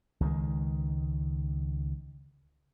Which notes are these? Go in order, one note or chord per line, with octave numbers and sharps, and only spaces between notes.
C#2 D#3 F3 G#3